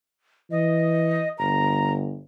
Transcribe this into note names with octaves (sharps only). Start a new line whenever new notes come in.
E3 D#5
G1 A#5